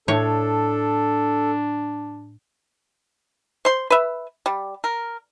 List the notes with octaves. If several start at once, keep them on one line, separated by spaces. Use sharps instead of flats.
A2 D4 A4 C#5
C5 C6
B4 E5
G3
A#4